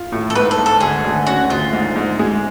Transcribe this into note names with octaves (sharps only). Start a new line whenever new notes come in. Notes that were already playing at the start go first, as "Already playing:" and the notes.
Already playing: F4
A2
A4
G#2 B4
A4
G#2
A4
D2 G#4
D2
C#4 F#4
D2 F4
G#2
G#2
G#3